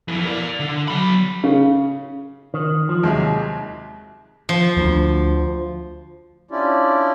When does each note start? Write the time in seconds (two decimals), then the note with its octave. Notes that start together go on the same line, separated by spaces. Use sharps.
0.08 F2 E3
0.25 A#4 D5
0.60 D3
0.88 F#3 B5
1.44 C#3
2.54 D#3
2.89 F3
3.03 D#2 C3 F#3 G#3
4.49 F3
4.77 D2
6.51 C#4 D4 E4 F4 G4 D5